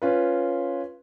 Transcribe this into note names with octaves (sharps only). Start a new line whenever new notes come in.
C#4 F4 B4